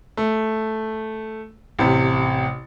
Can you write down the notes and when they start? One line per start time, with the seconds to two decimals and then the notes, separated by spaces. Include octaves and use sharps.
0.17 A3
1.79 A1 C3